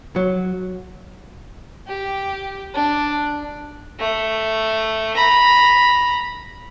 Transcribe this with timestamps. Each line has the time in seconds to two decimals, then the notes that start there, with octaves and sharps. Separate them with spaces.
0.16 F#3
1.87 G4
2.74 D4
4.00 A3
5.17 A#5 B5